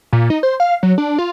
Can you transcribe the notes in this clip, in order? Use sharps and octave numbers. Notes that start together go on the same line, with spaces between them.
A#2
D#4
C5
F5
F#3
D4
F4